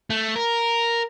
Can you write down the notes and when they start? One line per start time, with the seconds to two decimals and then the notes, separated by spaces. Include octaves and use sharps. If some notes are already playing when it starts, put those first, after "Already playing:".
0.10 A3
0.36 A#4